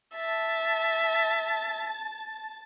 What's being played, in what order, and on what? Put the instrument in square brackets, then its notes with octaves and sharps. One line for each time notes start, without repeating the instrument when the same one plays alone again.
[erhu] E5 [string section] A5 A6